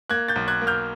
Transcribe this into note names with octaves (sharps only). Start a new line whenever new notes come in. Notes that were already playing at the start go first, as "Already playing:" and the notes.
A#3 F#6 G#6
G6 A6
B1
F#6 G#6
A#3
F6 G6